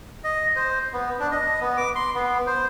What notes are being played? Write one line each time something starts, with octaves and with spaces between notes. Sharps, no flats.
D#5
C5
B3
D4
D#5
B3
D6
C6
B3
C5